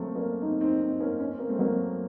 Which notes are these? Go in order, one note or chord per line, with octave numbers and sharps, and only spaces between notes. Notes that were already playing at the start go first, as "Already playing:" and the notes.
Already playing: F#3 A3 A#3 C4
A#3 C#4
C4 D#4
C4 D#4
C4 D#4
A#3 C#4
C#4
C4
A#3
A3 C4
F#3 A#3